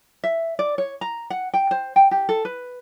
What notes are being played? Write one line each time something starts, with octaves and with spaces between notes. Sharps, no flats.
E5
D5
C#5
A#5
F#5
G5
C5
G5
G4
A4
B4